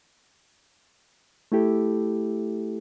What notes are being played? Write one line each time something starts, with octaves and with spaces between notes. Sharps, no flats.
A3 E4 G4 A4